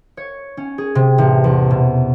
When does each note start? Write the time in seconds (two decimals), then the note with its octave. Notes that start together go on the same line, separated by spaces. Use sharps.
0.17 C#5
0.57 C#4
0.78 G#4
0.95 C3
1.18 A1
1.44 E2
1.71 B2